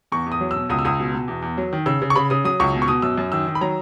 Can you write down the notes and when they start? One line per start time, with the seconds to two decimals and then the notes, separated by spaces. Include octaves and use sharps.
0.12 E2 C#6
0.26 E2
0.32 D#6
0.41 F#3
0.51 E6
0.56 B2
0.69 C#2 D#6
0.79 E6
0.85 C#2 D#6
1.00 B2
1.14 B2
1.28 E2
1.42 E2
1.58 F#3
1.73 D#3
1.86 C#3 E6
2.02 C#3
2.10 C#6
2.16 C#3 B5
2.30 C#3 D#6
2.44 F#3 D#6
2.60 C#2 C#6
2.74 B2
2.82 C#6
2.88 B2 D#6
3.02 F#2 E6
3.18 F#2
3.32 D#3 E6
3.47 D#3
3.55 B5
3.61 F#3 A#5